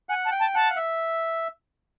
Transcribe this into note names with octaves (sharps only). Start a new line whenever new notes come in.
F#5 G#5
A5
G5
A5
F#5 A5
F5
E5